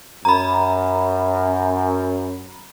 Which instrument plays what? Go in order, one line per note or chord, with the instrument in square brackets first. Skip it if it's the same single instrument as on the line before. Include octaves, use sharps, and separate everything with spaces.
[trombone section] F#2 [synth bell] A#5 B5